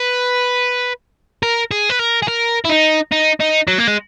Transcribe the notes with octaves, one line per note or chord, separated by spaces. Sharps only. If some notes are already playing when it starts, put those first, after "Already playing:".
Already playing: B4
A#4
G#4
B4
A#4
G#4
A#4
E4
D#4
D#4
D#4
F#3
A#3
G#3